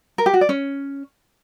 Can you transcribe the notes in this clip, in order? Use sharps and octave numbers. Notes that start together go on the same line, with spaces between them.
A#4
G4
F#4
D5
C#4